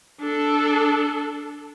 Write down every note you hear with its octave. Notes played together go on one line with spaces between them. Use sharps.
D4 A4